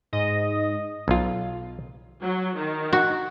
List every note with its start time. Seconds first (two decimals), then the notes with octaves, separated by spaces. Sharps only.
0.13 G#2 D#5
1.08 B1 F4
2.22 F#3
2.57 D#3
2.93 F#4